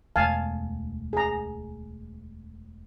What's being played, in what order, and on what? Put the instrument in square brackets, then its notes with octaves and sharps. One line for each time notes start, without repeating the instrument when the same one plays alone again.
[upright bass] E1 D2 [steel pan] F5 G#5 A5
[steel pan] G#4 A#5